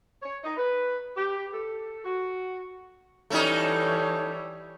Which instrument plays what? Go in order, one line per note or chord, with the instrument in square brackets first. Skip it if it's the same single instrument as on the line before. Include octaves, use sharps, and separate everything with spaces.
[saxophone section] C#5
D#4
B4
G4
A4
F#4
[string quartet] E3 G3 C#5 [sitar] A3 C#4 D#4